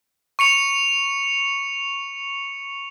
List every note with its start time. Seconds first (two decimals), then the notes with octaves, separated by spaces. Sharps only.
0.39 C#6 C#7 F7